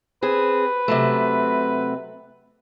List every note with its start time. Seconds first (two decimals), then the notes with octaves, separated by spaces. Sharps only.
0.22 C4 G#4 B4
0.88 C3 F#3 A3